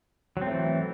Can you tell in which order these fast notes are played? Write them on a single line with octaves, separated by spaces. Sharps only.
F#3 C4 A3 E3